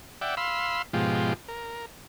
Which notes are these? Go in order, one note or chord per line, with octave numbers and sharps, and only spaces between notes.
D5 E5 F#5 G5
F5 B5 C6 E6
G#2 B2 F3 G#3 F4 G4
A#4